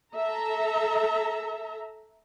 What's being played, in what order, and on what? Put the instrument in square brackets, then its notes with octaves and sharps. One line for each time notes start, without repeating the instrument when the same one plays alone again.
[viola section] A4 E5 A#5